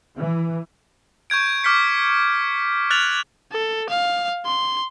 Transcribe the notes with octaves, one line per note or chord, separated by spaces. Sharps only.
E3
C#6 G6 G#6 D7
D6 F6 G6 B6 C#7
F6 F#6 A6 F7 F#7
A4
F5
C6